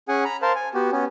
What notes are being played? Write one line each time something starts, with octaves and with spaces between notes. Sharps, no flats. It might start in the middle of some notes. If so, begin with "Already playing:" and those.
C#4 G#4 F#5 G#5
A#5 B5
A#4 C5 F5 A5
G#5
B3 F#4 G4
B3 C#4